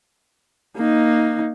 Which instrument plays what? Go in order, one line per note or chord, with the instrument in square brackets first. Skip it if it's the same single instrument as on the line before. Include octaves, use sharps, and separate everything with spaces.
[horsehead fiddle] A#3 D#4